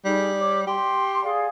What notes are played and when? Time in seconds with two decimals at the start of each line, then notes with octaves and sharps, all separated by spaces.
0.05 G3 D#4 G#4
0.39 C#5 D6
0.67 G4 C6
1.23 G#4 D5 F5